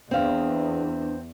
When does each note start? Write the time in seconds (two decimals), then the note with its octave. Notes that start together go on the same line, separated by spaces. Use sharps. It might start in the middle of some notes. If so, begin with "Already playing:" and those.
0.11 E2 C4 D4 F5